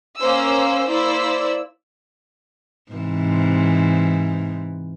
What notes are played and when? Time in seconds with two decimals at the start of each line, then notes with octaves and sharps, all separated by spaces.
0.18 A#3 C#4 C5 E6
0.86 A#3 E4 C5 D5 E6
2.92 G#2 C3 E3